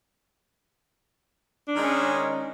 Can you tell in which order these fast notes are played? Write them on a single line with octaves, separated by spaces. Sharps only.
D4 D#3 G#3 C#4